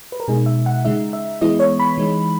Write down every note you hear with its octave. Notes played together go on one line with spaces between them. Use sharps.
B4
A#4
B2 G#3 D#4 G#4
E5
F#5
C#3 G#3 D#4 E5
E5
E3 G#3 B3 E4 D#5
C#5
B5
E3 G#3 D#4